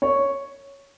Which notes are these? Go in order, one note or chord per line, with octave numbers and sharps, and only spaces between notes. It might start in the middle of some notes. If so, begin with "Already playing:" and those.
C#5